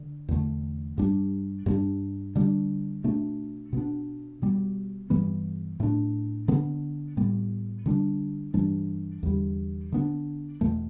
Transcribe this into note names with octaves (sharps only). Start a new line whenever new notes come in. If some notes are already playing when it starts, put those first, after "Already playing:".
Already playing: D3
E2 D3 A3
G2 G3 D4
G2 G3 B3 D4
D3 G3 D4
B2 A3 D4
B2 B3 D4
B2 G3 B3
G2 E3 G3 B3
A2 A3 D4
D3 B3 D4
A2 G3 B3
D3 G3 D4
G2 E3 G3 D4
E2 D3 G3
D3 B3 D4
E2 B2 A3